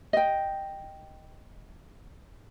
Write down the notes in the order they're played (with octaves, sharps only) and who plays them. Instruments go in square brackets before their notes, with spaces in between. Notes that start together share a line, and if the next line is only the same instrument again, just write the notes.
[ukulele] D#5 G5